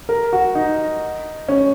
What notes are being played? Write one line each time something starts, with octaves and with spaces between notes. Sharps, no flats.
A#4
F#4
D#4
C#4